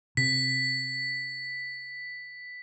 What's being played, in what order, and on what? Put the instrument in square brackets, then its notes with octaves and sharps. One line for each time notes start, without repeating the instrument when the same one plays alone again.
[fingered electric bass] C3 [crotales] B6